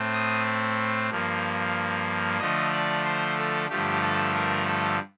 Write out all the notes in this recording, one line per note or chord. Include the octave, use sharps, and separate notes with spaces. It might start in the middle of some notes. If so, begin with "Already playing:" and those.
Already playing: A2 A3 C4
D#6
G2 F3 A#3
D3 F3 A3 D#5
D5
C5
A4
G2 D3 F3 A3 G4
A4
A#4
A4